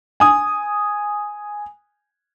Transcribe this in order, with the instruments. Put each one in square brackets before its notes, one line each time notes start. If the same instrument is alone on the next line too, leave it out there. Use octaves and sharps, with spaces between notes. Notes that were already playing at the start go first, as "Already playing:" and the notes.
[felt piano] G#5 D#6